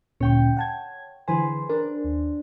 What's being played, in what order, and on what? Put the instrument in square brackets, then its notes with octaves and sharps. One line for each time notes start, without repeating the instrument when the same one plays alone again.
[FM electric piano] D2 A#2 C#4 [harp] C#5 G5 C#6
[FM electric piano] F#5 A5 G#6
[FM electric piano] D3 E3 G#5 [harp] G#4 B4 C5
[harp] D4 [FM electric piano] A#4
[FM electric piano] D#2